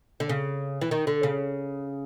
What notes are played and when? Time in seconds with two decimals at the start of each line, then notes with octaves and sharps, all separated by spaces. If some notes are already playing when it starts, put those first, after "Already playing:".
0.20 D3
0.29 C#3
0.81 E3
0.91 D#3
1.07 D3
1.23 C#3